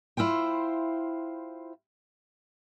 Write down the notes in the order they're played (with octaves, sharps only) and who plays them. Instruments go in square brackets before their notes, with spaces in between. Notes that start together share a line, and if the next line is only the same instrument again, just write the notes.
[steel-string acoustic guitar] E4 F4 C5 G5